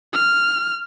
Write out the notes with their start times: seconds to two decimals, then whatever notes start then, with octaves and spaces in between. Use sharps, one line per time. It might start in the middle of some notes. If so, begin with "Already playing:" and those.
0.13 F6